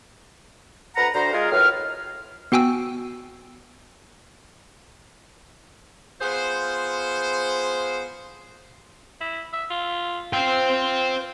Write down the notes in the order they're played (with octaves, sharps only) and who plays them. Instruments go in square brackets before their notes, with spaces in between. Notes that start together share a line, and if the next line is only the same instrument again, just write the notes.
[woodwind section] D2 B4 F#5 A#5
D2 C5 A#5
G#3 F4 G#4 A#4 F5
F#2 A2 B4 F6
[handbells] B3 F#4 G5 G#5 E6
[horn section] B3 F4 G#4 C5
[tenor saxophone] E4
E5
F4
[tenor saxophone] F4 [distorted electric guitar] C5 G5